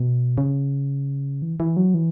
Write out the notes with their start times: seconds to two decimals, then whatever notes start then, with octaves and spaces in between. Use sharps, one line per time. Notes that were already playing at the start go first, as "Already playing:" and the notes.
Already playing: B2
0.38 C#3
1.42 E3
1.60 E3
1.77 F#3
1.94 E3